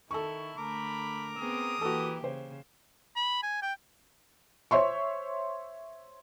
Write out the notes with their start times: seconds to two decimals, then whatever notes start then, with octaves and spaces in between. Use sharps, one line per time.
0.11 D#3 E4 A4 C#6
0.58 D3 A3 A#4 A#5 B5 D6
1.38 B3 C4 G#4 D#6
1.81 E3 A#3 F#4 G4 A4
2.24 C#3 C5
3.16 B5
3.43 G#5
3.62 G5
4.71 C5 C#5 E5 C6 C#6